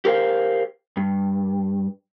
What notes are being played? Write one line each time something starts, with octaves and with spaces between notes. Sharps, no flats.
G4 A#4 C5 F5
G2